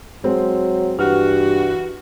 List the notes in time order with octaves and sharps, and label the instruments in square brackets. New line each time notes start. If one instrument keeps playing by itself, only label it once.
[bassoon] F#3 [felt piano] G#3 C4
[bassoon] G2 [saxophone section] E3 F#4 [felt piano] F6